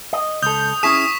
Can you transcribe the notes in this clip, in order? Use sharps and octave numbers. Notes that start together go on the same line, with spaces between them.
D#5
C#2 A4 D#6 G6
C#4 E4 G#4 C#6 D#6 B6 E7